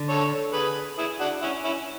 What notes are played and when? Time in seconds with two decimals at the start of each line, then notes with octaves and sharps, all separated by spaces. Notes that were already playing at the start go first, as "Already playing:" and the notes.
Already playing: D3
0.09 A4 C#5
0.53 G#4 B4
0.98 E4 G#4
1.20 D4 F#4
1.42 C#4 E4
1.64 C#4 E4